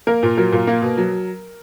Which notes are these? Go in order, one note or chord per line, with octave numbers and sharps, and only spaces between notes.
A#3 A#4
A#2
F#3 A#4
A#2
A#3
B2
F#3